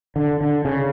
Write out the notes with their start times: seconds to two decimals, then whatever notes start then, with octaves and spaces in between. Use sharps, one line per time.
0.16 D3
0.41 D3
0.65 C#3